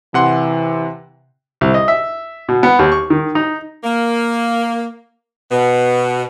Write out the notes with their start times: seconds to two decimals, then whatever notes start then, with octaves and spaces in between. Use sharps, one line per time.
0.14 C3 E3 F#5 C6
1.61 C2
1.74 D#5
1.88 E5
2.49 B2
2.63 B3
2.79 D#2
2.92 C#6
3.10 D#3
3.35 D#4
3.83 A#3
5.50 B2